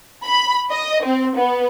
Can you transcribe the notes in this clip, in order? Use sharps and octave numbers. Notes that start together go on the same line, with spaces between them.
B5
D#5
C4
B3